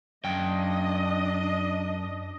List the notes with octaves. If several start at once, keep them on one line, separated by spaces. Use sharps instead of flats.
F#2 D4 D#5 G5